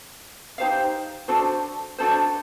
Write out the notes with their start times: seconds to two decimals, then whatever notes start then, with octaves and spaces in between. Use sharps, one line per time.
0.58 D#4 G4 C5 F5
1.28 D4 F#4 A4 C5
1.98 D4 F#4 A4 C5